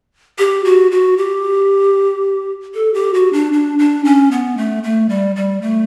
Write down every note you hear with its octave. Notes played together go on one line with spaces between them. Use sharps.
G4
F#4
F#4
G4
A4
G4
F#4
D4
D4
D4
C#4
B3
A3
A3
G3
G3
A3